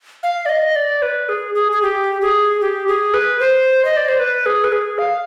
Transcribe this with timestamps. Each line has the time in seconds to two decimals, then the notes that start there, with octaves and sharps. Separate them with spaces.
0.23 F5
0.46 D5
0.49 D#5
0.76 D5
1.02 B4
1.29 G#4
1.55 G#4
1.72 G#4
1.82 G4
2.22 G#4
2.61 G4
2.88 G#4
3.14 B4
3.40 C5
3.85 D#5
3.97 D5
4.08 C5
4.20 B4
4.46 G#4
4.64 B4
4.72 G#4
4.98 F5